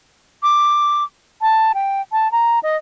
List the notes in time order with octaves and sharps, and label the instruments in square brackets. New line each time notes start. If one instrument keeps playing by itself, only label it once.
[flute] D6
A5
G5
A5
A#5
D#5